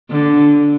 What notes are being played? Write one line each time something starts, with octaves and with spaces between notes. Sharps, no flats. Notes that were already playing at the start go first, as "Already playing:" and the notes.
D3